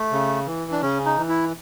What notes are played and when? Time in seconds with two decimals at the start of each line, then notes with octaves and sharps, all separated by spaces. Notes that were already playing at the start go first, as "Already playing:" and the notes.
Already playing: A3
0.12 C#3
0.46 E3
0.72 D4
0.82 C#3 C#4
1.06 D#4
1.17 E3
1.29 E4